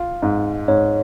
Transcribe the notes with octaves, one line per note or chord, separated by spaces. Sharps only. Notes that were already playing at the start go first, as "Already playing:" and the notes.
Already playing: F4
G#2
G#2 C#5